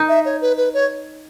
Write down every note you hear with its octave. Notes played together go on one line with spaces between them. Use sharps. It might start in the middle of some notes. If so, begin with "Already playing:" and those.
Already playing: D#4
E5
C#5
B4
B4
C#5